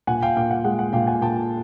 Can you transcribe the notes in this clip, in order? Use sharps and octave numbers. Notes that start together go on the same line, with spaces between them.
A#2 F#5 G#5
F5 G5
A#2 F5 G5
F#5
G#3 F#5
F#5
A#2 F5 G5
F#5 G#5
A#2 G5 A5